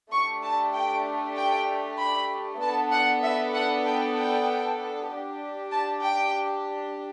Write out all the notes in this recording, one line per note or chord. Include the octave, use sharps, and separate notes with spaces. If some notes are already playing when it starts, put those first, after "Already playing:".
A3 D4 G4 C#6
A5
G5
G5
B5
B3 D4 A4 A5
F#5
E5
F#5
G5
G5
D4 G4
A5
G5